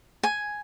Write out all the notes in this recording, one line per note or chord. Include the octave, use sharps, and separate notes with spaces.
G#5